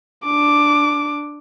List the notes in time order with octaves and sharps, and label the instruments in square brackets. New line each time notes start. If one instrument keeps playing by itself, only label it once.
[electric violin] D4 D6